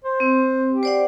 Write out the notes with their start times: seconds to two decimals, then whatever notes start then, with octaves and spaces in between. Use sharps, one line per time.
0.05 C5
0.20 C4
0.70 G4
0.83 C5 D5 F#5